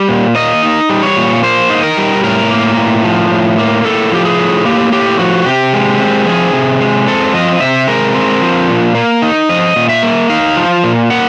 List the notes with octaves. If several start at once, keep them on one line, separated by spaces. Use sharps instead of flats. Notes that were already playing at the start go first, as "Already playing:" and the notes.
Already playing: G3
A#2
A#3 D#5
D#4
G3
C#5
A#2
A#3 C5
D#4
A#4
G3
A2 A#4
A#3
A2
F3
A2
A#3
A2 A4
F3 G4
G#4
A2
A#3 G4
A2 G4
F3 F#4
C3 G4
G#3
C4
F3 G#4
C3
G#3
C4 A4
F3 D#5
C3 E5
G#3 A#4
C4
F3
A#2
A#3
D#4
F3 D#5
A#2
E5
A#3
D#4 F5
F3
A#2
A#3 F#5